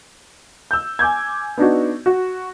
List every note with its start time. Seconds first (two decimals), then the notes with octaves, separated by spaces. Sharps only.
0.71 E6 G6
0.99 G#5 D6 G6 G#6
1.57 B3 D4 D#4 F#4
2.06 F#4